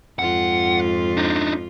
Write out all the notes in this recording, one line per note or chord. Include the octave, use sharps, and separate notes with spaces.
F2 G#2 F4 F#5
D4 D#4